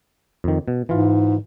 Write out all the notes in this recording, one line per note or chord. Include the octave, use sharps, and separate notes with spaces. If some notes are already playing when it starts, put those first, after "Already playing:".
F2 D#3
B2
G#2 E3 F4